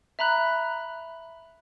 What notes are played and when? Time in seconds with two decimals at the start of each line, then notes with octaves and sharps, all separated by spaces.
0.19 E5 A#5 B5 F#6